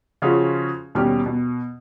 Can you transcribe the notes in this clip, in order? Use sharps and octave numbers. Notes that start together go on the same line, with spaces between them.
C#3 F3 C#4 F4 F#4 G#4
D#2 B2 G3 C#4 G4 F6
B2